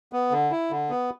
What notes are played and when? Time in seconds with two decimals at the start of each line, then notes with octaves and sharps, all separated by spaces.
0.13 B3
0.31 D3
0.51 E4
0.71 D3
0.90 B3